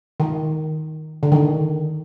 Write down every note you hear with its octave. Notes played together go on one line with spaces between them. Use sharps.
D#3
D3
D#3